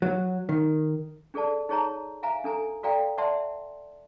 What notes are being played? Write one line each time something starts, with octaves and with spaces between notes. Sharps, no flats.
F#3
D#3
D4 G#4 A4 D5 A5
D#4 G#4 C#5 A5 A#5
E5 F5 G#5 A#5
D4 A4 G#5 A#5
F#4 A4 D5 F5 G5 A#5
D5 E5 F#5 A5 C6